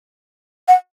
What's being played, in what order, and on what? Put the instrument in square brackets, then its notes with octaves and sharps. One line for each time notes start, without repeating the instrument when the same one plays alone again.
[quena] F#5